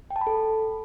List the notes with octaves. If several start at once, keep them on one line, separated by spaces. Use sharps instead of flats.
G5
A5
B5
A4